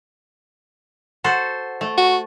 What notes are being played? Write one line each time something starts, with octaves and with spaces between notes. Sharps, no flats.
F#4 A4 C5
A3
F#4